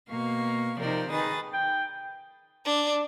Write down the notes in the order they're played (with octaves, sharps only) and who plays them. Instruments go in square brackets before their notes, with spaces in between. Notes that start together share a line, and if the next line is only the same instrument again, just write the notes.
[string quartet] B2 A#3 F5 C#6
C3 F3 D#4 A#4 C5 D5
D#3 D#4 G#4 B4 D#6 A6
[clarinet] G5
[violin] D4